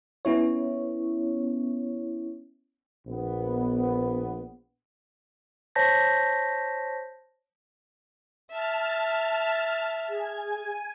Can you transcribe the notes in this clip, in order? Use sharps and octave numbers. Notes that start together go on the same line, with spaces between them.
B3 C#4 E4 C#5
A#1 B3
C5 C#5 A5 G6 A#6 B6
E5 A5 F6
G#4 G#5